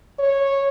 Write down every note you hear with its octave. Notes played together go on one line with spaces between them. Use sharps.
C#5